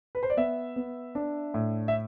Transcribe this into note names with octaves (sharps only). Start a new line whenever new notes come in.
B4
C5
D5
B3 E5
B3
D4
A2
E5